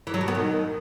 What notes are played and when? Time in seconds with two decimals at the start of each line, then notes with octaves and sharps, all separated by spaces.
0.07 E3
0.14 F#3
0.21 B2
0.28 B3
0.35 D#3